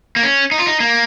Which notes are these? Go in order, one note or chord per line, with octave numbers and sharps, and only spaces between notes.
A#3
C#4
D#4
F4
D#4
A#3